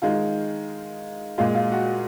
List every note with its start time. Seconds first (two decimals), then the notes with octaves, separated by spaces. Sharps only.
0.02 D#3 G#3 F4
1.38 A#2 G#3 F4
1.55 F4
1.72 F#4